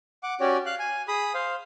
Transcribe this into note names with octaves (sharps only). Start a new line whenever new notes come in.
F#5 D6
C#4 F#4 G4 C#5 D5
F5 F#6
G#5
G#4 B5 D#6
C5 F5